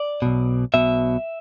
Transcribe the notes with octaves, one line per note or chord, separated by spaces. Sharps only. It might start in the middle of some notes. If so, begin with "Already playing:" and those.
Already playing: D5
B1 B2
B1 B2 E5